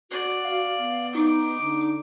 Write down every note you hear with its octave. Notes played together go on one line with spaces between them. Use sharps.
F#4 D5
F5
B3
D#4 D6
D3